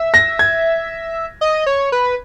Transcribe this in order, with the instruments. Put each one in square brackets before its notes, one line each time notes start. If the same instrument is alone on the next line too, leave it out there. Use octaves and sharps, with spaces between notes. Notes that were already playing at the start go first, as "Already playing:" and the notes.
Already playing: [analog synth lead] E5
[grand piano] A#6
G#6
[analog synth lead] D#5
C#5
B4